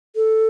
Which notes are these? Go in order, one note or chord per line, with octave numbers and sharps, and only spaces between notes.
A4